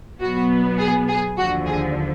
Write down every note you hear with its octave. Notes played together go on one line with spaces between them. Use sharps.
B2 F#3 B3 F#4
G#4
G#4
D#2 D3 F3 F#4
G#4